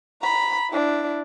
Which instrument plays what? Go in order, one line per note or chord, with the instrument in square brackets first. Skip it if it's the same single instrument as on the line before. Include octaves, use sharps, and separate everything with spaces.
[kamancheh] A#5 B5
D4 E4